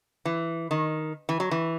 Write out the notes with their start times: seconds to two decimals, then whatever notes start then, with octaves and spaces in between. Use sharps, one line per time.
0.25 E3
0.71 D#3
1.29 E3
1.40 F#3
1.51 E3